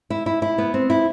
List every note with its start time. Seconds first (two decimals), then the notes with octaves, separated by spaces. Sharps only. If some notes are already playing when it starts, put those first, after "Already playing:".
0.10 E4
0.26 E4
0.42 E4
0.58 B3
0.74 C4
0.90 E4